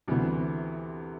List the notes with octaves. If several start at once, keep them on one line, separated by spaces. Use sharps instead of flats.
D2 C3 E3 G3 B3